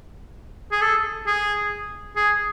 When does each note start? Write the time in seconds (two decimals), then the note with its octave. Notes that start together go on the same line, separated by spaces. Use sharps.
0.72 G#4
0.82 A4
1.27 G#4
2.16 G#4